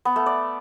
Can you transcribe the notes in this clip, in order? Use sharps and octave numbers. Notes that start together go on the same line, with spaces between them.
B3
A3
D5